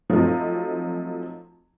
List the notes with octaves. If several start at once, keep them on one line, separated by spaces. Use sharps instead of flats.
F3 F#3 A3 C4 D#4